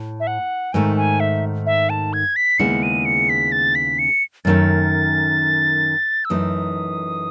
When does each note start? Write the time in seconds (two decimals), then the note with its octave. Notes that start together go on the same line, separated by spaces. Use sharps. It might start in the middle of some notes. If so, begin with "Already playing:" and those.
Already playing: A2
0.20 E5
0.27 F#5
0.73 G#2 D#3 A3 G#5
0.97 G#5
1.20 E5
1.66 E5
1.90 A5
2.13 G#6
2.36 B6
2.59 D#2 C#3 G#3 B3 E4 C#7
2.83 D#7
3.05 C#7
3.29 B6
3.52 A6
3.75 B6
3.99 C#7
4.45 F#2 D#3 A3 C#4 A6
6.25 E6
6.30 F#2 E3 A3 D#4 D#6